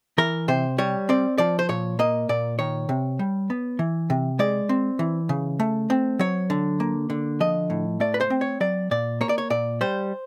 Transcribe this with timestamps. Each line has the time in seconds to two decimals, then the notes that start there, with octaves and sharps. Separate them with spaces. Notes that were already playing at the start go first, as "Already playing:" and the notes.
0.18 E3 A#4
0.48 C3 C5
0.78 G3 C#5
1.09 C4 D5
1.38 F3 D5
1.59 C5
1.69 A#2 C#5
1.99 A#3 D#5
2.29 A#2 D5
2.59 D#3 C#5
2.89 C3
3.19 G3
3.50 B3
3.79 E3
4.10 C3
4.39 G#3 D5
4.69 C4
4.99 E3
5.29 C#3
5.60 A3
5.90 C4
6.19 F#3 C#5
6.50 D3
6.80 A#3
7.10 D3
7.40 F3 D#5
7.70 A2
8.00 A3 D5
8.14 B4
8.21 C5
8.30 C4
8.41 C#5
8.60 F#3 D5
8.91 A#2 D5
9.21 A#3 C#5
9.29 D5
9.38 C#5
9.50 A#2 D5
9.81 G3 C5